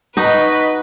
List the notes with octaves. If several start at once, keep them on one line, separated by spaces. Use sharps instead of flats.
D#4 F#4 B4 D#5